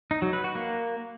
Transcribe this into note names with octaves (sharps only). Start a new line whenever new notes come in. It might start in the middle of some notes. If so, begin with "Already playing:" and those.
D#4
F#3
B4
F#4
A#3